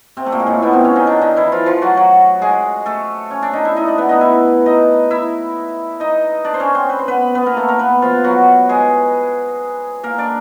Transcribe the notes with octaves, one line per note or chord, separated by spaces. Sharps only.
C3 C4
A3
A#2 A#3
G#3
A2 A3
B2 B3
C3 C4
C#3 C#4
D#3 D#4
D3 D4
D#3 D#4
E3 E4
F3 F4
F3 F4
F#3 F#4
F#3 F#4
G#3 G#4
A3 A4
C#4 C#5
D4 D5
D#4 D#5
E4 E5
D#4 D#5
D4 D5
B3 B4
D#4 D#5
E4 E5
D#4 D#5
E4 E5
D#4 D#5
D4 D5
C5
C#4 C#5
C4 C5
B4
C5
B3 B4
B3 B4
A#3 A#4
A3 A4
A#3 A#4
B3 B4
F3 F4
F#3 F#4
G#3 G#4
A#3 A#4
D4 D5